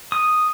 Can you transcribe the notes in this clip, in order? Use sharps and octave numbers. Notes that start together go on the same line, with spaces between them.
D#6